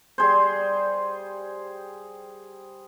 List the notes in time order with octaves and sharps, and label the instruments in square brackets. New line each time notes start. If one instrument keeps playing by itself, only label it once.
[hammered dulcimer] G3 G#4 C5